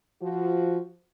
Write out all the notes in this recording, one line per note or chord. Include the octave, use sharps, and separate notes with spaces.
F3 F#4